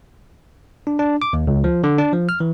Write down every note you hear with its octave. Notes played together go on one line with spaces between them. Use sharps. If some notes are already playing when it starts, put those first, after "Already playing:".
D4
D4
D6
D#2
C#2
F3
D3
D4
F3
F6
E3